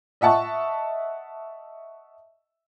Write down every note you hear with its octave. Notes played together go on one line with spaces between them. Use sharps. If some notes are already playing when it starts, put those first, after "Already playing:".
D#5 E5 F#5 A5 C#6